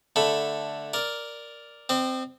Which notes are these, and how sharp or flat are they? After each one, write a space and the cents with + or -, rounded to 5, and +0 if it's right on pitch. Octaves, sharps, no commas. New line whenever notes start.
D3 +0 A3 +0 B5 +0
A#4 +0 D5 +0
C4 -10 D#5 -45